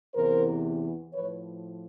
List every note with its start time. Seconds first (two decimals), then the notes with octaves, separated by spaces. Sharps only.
0.14 E2 C3 E3 A#4 C5
1.13 A2 F3 B4 C#5